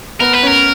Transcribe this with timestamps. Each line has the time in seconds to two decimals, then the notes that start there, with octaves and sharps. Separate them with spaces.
0.21 B3 A#4
0.34 B4
0.43 C#4 A#4